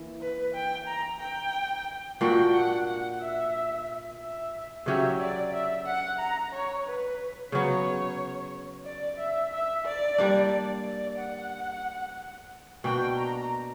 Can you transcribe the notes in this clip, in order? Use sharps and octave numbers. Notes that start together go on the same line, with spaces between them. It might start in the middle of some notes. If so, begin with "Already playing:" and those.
Already playing: E3 A#3 E4
B4
G5
A#5
G5
A#2 A#3 D4 F#4 G5
F#5
F#5
E5
E5
C#3 F#3 C#4 G4 E5
D5
E5
F#5
A#5
C#5
B4
C#3 F#3 B3 C#5
D5
E5
E5
D5
G3 A#3 D4
D5
F#5
B2 A#3 D4 F#4 G5
A#5